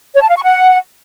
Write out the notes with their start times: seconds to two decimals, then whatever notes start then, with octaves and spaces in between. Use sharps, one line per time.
0.14 C#5
0.21 A5
0.28 F5
0.36 C#6
0.43 F#5